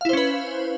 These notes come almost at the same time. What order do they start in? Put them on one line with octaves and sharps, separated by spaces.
F5 E4 C5 C#4 B4